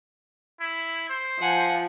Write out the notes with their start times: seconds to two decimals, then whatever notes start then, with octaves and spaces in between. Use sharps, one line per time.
0.60 E4
1.10 C5
1.41 F3 F#5 G#5